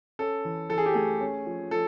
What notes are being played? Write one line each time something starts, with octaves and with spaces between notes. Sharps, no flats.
C#4 A4
E3
E3 A4
G#4
G4
A3 G#4
C#4
F3
F3 A4